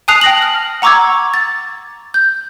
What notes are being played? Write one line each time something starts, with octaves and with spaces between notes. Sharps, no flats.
G#5 A5 D#6 F#6 C7 F7
G5 A#6 F#7
F6 A#6
F#5 A#5 C#6 D6 E6 G#6
A6
G6